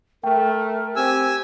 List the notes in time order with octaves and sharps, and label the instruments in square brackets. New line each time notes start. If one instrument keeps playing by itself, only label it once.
[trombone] A3 [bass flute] A#4 [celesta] G5
[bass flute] C4 [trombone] G4 [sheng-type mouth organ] G#5 E6